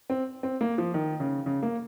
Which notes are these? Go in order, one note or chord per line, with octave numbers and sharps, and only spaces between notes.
C4
C4
A#3
F3
D#3
C#3
C#3
A#3